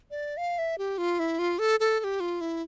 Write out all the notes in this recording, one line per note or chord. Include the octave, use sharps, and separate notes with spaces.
D5
F5
E5
G4
F4
E4
F4
A4
A4
A4
G4
F4
E4